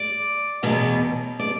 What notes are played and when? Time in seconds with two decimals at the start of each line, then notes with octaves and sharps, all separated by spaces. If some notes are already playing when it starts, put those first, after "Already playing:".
Already playing: D5
0.63 E2 B2 F#3 B3
1.39 D5